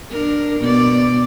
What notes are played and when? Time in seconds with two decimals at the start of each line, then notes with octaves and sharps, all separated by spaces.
0.11 D4 A#4
0.60 B2 D5